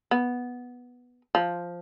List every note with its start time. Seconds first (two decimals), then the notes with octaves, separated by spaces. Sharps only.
0.11 B3
1.35 F3